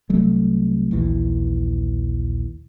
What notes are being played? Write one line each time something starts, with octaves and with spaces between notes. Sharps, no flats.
C2 F#3 A3
A#1 D#2 E3